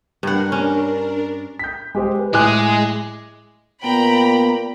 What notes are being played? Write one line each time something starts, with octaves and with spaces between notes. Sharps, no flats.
G2 D4 A#4 F#5
C#4
G6 B6
G#3 G4 C5
B4
A2 G#3 G#4 D6 F#6
A#2 B3 G5 A#5 B5